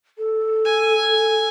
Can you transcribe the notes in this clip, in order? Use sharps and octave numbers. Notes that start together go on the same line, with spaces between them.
A4
G#5